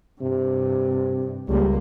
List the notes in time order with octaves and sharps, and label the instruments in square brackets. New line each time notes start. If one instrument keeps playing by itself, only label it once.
[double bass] G2 [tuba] C3
[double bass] C#2 A#3 [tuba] G3